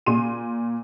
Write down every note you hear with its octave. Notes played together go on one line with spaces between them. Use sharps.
A#2 C6 D#7